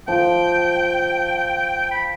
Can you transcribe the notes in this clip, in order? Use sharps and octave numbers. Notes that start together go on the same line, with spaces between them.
F3 G5
B5